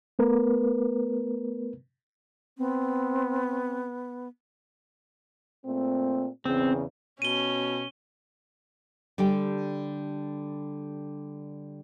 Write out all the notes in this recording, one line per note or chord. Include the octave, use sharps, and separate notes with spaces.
A3 B3 A#4 B4
B3 C4
A#2 A3 C4
E2 C#3 C4
B2 C#4 D#7 G7
D3 G3 D4 G4 G5